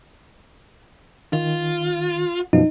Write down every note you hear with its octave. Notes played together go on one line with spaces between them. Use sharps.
D#3 F4
F#2 B2 F3 D#4